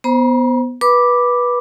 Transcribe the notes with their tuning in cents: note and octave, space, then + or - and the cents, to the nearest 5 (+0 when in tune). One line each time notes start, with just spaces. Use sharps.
B3 +0 C5 +0 A#5 +45
B4 -20 B5 +0 D6 +0